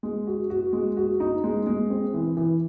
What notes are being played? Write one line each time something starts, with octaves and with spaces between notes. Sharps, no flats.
G#3
F#4
F#4
G#3
F#4
D#4
G#3
G#3
C4
E3
E3